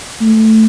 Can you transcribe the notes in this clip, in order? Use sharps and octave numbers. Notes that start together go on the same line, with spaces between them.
A3